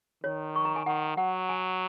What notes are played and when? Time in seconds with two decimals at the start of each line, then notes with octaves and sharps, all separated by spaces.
0.24 D#3 C#5
0.56 C#6
0.65 A#5
0.76 G#5
0.86 D#3 F#5
1.17 F#3 F#5
1.49 G#5